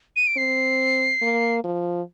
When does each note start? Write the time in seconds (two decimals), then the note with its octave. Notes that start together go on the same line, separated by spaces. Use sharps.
0.16 D#7
0.27 D7
0.37 C4 C7
1.22 A#3
1.64 F3